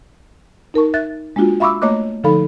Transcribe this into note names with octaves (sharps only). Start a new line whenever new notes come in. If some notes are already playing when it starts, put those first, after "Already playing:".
D#4 A#4 A5 C#6
E5 F#6 A6
G#3 A#3 D4 F4 F#4
E5 F5 B5 C#6 D6 E6
A3 A#3 C#5 D#5 D6 F#6
D3 F3 D#4 A4 F5 B5